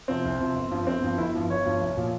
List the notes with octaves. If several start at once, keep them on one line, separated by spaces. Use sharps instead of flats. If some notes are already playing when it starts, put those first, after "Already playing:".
C3 F3 C4
C2
C3 F3
G1
G2 F3
G1 C4
G2 F3
G1 E4
G2 F3
G1 C#5
G2 F3
C2
A#2 F3